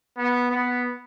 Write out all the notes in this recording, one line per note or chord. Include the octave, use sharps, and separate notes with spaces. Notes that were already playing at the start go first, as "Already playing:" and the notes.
B3
B3